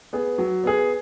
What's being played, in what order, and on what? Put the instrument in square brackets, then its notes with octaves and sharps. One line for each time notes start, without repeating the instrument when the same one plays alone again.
[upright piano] B3 G#4
F#3
B3 G#4